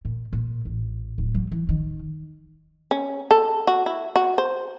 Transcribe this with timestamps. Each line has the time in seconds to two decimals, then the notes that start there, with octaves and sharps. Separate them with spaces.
0.05 A#2
0.33 A#2
0.65 A1
1.18 D1
1.34 F#3
1.52 E3
1.69 D#3
2.91 C#4
3.31 A4
3.67 F#4
3.86 E4
4.16 F#4
4.38 C5